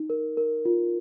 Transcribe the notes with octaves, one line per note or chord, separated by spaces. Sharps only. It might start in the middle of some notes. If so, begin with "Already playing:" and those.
Already playing: D#4
A#4
A#4
F4